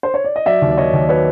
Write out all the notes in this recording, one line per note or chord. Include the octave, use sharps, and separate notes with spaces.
C5
C#5
D5
D#5
F#3 D5 E5
D#2
D5
D#3 C#5 D#5
D#2
F#3 B4 C#5